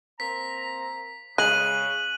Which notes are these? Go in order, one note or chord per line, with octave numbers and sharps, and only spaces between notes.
A#3 C4 A#5 B6
C#3 G#3 F#6 D#7 F#7